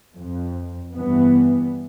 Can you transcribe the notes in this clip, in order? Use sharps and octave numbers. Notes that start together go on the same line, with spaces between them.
F2
G2 E3 B3